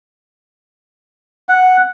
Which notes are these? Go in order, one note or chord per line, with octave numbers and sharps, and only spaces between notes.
F#5